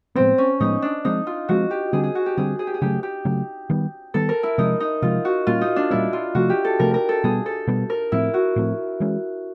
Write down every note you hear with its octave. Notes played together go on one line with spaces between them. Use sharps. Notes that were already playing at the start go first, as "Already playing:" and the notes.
A2 F3 G#3 B3 C4
C#4
A2 F3 G#3 B3 D#4
D4
F3 G#3 C4 D#4
F4
F3 G#3 C4 F#4
G4
D3 G3 C4 G#4
G#4
F#4
G4
D3 G3 C4 G#4
G#4
G4
G#4
C#3 F#3 A3 G4
G4
C#3 F#3 A3
D#3 G3 B3
D#3 G3 B3 A4
A#4
E4
C3 F3 G#3 D#4
D#4
C3 F3 G#3 F4
F#4
A#2 G3 A#3 C#4 F4
D#4
D4
A#2 G3 A#3 C#4 E4
F4
C3 F3 A3 F#4
G4
A4
C3 F3 A3 A#4
A#4
A4
B2 G3 B3 G#4
A4
B2 G3 B3
A#4
A2 F3 A3 C4 E4
F#4
A2 F3 A3 C4
E3 G#3 C#4